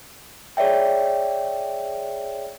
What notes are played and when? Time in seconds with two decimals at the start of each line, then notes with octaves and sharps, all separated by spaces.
0.57 G#4 C#5 D5 E5 G5